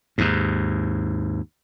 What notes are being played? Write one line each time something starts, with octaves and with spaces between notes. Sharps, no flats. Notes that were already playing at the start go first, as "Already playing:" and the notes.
D#2 G#2